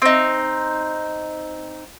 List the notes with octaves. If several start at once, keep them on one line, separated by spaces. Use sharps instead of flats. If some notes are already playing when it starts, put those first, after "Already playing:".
C4 D#4